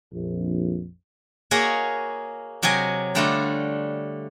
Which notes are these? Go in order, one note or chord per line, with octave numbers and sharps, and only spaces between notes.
A#1 F2
A#3 F#4 G#4 C#5 D#5 A#5
C3 F#3 D#5 G5 G#5
D3 G3 A3 D4 F4 F#4